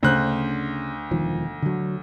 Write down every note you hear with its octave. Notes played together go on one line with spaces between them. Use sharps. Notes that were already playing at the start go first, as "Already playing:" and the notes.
D2 C#3 D4 C5 F#6
E1 D#3 F3
D3 F#3